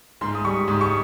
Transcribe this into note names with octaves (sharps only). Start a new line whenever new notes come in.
G#2 C6
D#6
G3 C#6
G#2 D#6
C#6